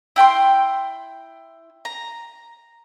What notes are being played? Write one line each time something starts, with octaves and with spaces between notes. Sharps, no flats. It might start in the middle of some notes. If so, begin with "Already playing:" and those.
E4 G5 A#5 C6
A#5